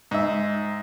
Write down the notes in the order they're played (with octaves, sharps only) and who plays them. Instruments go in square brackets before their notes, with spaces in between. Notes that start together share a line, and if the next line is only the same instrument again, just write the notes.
[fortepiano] G#2 E5